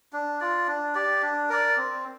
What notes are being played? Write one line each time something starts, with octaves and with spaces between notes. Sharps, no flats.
D4
F4 D5
D4
G4 D5
D4
A#4 D5
C4